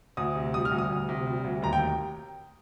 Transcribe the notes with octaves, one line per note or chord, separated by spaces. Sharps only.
D2 D#6
C3
G3 D#6
F6
D2
D#6
D2
C3
G3
D2
D#2 A#5
G5